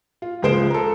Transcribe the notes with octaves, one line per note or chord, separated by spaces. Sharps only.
F4
C#2 F3 G#3 C5 D7 E7
A4 A#5